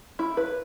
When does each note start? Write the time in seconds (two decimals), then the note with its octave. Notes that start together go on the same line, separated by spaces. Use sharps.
0.19 E4
0.37 B4